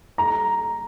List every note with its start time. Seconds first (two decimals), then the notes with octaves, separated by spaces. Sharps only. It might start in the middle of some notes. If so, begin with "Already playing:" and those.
0.18 A#5